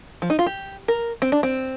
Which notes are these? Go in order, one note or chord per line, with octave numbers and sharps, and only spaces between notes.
F3
D#4
F4
G4
A#4
C4
D4
C4